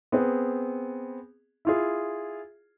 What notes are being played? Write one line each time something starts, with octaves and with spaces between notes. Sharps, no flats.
B3 C4 G#4
E4 F4 G#4